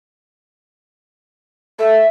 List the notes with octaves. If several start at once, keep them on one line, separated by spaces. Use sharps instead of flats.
A3 E5